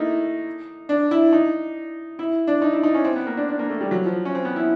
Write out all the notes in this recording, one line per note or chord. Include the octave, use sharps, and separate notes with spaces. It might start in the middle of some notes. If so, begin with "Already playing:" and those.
Already playing: A3 A#3 D#4 E4
D4
E4
D#4
E4
D4
D#4
E4
D#4
C#4
C4
B3
A#3
D4
D4
A#3
A3
G3
F#3
F3
C#4
C4
B3
E4